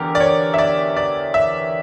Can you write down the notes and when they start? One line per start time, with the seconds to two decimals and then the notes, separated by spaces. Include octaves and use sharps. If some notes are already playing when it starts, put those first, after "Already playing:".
Already playing: E2 D3 G4 A#4
0.15 D5
0.20 C#5
0.54 E5
0.58 D5
0.97 D5
1.34 E5